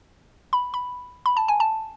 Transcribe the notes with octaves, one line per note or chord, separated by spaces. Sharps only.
B5
B5
B5
A5
G#5
A5